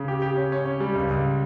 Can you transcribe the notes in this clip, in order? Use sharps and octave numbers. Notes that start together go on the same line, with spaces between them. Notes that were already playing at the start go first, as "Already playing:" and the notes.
Already playing: C#3
G4
G4
C#4
C#4
C#4
G3
C#2
C#2